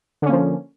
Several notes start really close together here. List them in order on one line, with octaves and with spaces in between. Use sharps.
D3 C#4 A#3 F3